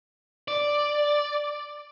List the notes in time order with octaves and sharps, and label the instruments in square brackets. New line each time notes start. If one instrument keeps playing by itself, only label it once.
[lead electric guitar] D5